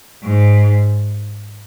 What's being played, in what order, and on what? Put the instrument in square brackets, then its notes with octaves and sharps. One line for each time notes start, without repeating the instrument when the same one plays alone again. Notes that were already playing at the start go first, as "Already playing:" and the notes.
[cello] G#2